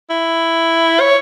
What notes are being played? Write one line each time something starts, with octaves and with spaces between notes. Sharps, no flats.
E4
C#5